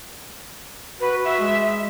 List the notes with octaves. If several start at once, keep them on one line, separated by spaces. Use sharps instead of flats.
F#4 B4
F#4 E5
G#3